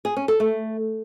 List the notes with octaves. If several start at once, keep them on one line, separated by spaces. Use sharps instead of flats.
G#4
C#4
A4
A3